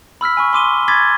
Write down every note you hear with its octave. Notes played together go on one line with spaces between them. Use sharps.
B5 E6 F6 B6
G#5 B5 C#6
C6 D6 D#7 G7
B5 D6 G#6 A6 B6